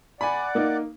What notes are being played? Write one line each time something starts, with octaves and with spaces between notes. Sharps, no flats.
D5 F#5 G#5 B5
A#3 D#4